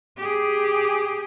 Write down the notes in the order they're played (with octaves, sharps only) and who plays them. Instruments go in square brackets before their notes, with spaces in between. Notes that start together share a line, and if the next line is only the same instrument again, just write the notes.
[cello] G4 G#4